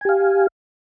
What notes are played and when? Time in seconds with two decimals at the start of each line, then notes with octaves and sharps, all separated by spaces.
0.01 G#5
0.05 G4
0.09 F5